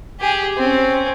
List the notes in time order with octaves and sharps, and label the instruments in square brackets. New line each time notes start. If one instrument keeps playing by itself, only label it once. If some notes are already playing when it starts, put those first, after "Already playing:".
[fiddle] G4 G#4
C4 C#4